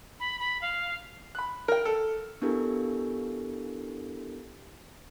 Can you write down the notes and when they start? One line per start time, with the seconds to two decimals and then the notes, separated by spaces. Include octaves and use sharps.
0.20 B5
0.40 B5
0.61 F5
1.35 B5 F#6
1.68 A#4 G5
1.85 A4
2.42 B3 D4 E4 G4 A4 A#4